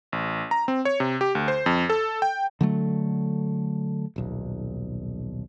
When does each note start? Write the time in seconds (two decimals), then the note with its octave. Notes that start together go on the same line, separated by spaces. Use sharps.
0.12 A1
0.51 A#5
0.68 C4
0.85 C#5
1.00 C3
1.21 G4
1.35 D2
1.48 C5
1.66 F2
1.90 A4
2.22 G5
2.61 D3 F#3 A3
4.16 D#1 B1